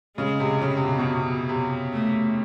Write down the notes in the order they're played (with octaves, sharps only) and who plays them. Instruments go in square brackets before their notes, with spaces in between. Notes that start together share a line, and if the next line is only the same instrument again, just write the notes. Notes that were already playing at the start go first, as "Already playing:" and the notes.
[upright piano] C#3 [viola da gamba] G#3
[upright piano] C3
C#3
C3
B2
B2
C3
C3
[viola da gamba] A3